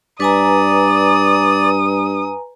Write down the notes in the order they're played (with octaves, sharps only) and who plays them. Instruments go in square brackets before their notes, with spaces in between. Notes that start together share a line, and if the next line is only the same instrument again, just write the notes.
[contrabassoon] G2 [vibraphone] B4 G#5 A#5 [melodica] D5 [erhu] D#6